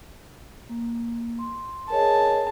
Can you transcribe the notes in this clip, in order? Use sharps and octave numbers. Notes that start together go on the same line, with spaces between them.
A#3
C6
G#4 A#4 C#5 D#5 A5